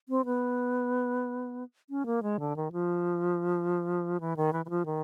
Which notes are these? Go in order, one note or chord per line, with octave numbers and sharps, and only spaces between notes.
C4
B3
C#4
A#3
G#3
D3
D#3
F3
E3
D#3
E3
E3
F3
D#3